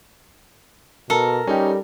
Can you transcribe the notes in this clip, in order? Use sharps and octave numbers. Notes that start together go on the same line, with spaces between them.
B2 A4 A#4
G3 C#4 D#4 G4